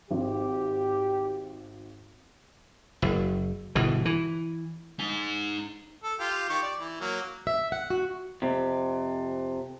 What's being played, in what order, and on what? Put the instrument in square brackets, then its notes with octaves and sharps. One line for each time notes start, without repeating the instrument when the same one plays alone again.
[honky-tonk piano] G#1 [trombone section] G4
[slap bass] F#1
G1 B2 E3
E3
[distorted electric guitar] D#4 G#5
[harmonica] A4
F4 G4
D#3 G4 C#6
D5
E3
F#3 A#3
[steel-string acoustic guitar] E5
F#5
F#4
[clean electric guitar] F2 C3